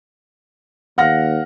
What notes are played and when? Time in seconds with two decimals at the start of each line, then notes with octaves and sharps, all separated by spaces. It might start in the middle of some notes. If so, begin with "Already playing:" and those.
0.98 D#2 F5 F#5 F6 A#6